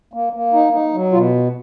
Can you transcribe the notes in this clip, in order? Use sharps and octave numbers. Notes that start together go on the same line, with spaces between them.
A#3
A#3
D#4
D#4
F#3
B2 F4